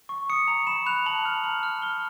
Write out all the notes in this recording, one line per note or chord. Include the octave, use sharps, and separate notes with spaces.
C#6
D#6 C#7
A#5
B5 E7
F#6 F7
A5 F#7
F6
A#5 F#7
F6
F6 G7